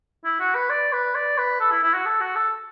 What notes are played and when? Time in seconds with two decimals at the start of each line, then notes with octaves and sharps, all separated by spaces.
0.25 E4
0.40 F#4
0.55 B4
0.70 D5
0.93 B4
1.15 D5
1.38 B4
1.60 A4
1.71 E4
1.83 E4
1.94 F#4
2.06 A4
2.21 F#4
2.36 A4